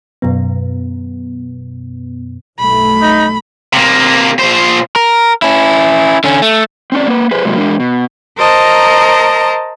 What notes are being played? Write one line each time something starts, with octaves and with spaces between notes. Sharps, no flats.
F#2 B2 B3
B1 G2 A3 B5
D#4
C3 A#3
A#2 C5
A#4
C#4 E4
D3 C#4
A3
C4 C#4 D5
A#3 B4
G#4 B4 C5
A2 C3 F#3 G#3 A#3
E2 G#3 D4 A#4
B2
A#4 C5 D#5 A5 A#5